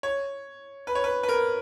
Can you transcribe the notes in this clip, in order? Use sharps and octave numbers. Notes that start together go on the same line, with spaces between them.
C#5
B4
C#5
B4
B4
A#4